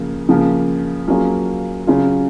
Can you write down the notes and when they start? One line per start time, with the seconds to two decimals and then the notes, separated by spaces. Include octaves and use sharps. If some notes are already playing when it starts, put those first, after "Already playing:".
Already playing: C#3 F3 A#3
0.29 C#3 F3 A#3
1.08 F#3 A#3 C#4 F4 G#4
1.87 C#3 F#3 C#4 F4 G#4